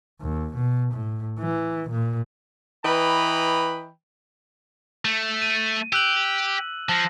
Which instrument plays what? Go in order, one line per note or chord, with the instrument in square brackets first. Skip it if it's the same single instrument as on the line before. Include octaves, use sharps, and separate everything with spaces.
[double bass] D#2
B2
A2
E3
A#2
[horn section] E3 B4 D#5 G5 A#5 B5
[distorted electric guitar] A3
[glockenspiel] D#7
[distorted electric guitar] G4 [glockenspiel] E6 F#6 F#7
[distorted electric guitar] F3 [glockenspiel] A5 A#6